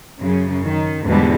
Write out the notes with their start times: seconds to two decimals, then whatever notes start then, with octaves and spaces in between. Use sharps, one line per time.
0.18 F#2 C#3
0.67 D#3
1.06 E2 G#2 B2 D3 G3 G#3